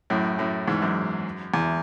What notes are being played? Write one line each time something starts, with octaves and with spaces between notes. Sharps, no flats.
F#2 A2
F#2 A2
E2 G#2
F#2
E2